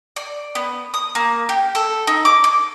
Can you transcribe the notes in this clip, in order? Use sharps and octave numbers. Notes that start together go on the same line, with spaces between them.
D5
B3
D#6
A#3
G4
A4
D#4
D6
D6